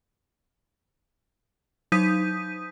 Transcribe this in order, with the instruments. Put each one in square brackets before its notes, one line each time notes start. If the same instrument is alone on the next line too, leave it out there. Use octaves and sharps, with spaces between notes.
[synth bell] F#3 D#4 D#6 G6 B6 D#7